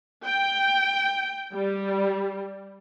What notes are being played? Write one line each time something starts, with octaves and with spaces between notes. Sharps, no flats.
G5
G3